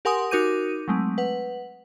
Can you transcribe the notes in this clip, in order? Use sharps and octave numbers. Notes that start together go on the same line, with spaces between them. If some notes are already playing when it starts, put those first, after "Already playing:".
G4 A#4 F#5 G#5 C6 D#6
D#4 F#4 A#4 D6 G6 D#7
F#3 G#3 A3 C4
B4 F#5